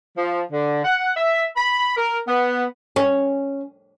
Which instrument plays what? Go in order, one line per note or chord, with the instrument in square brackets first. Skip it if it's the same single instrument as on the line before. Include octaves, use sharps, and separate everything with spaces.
[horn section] F3
D3
F#5
E5
B5
A#4
B3
[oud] C#4